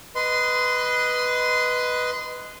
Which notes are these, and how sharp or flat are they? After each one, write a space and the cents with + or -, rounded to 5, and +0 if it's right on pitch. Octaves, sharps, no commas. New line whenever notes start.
B4 +0 D#5 +0 C6 -20